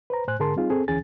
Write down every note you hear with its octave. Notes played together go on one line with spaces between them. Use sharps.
B4 C5 A#5
A2 C5 G#5 F#6
G#2 D3 G#4 A#4 A5 C6
G3 C4 D#4 F4 G#4
C4 G#4 A4
D2 E3 C#4 G#4 G#5 A6